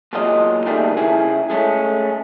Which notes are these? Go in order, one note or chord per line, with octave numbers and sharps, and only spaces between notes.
E2 A#2 F#3 G#3 F4 D#5
D3 D#3 G3 A3 A#3 G#4
C#3 E4 G#4
G#3 A3 C#4